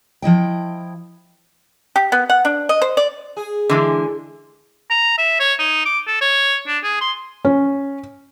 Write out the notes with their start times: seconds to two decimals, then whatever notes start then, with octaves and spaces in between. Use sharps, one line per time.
0.22 F3 E4 D#5 G5
1.96 G4
2.12 B3
2.30 F#5
2.45 D4
2.69 D#5
2.82 C5
2.97 D5
3.37 G#4
3.69 D3 E3 G#3
4.90 A#5
5.18 E5
5.40 C#5
5.59 D#4
5.86 D6
6.07 A4
6.21 C#5
6.67 D4
6.84 G#4
7.01 C6
7.45 C#4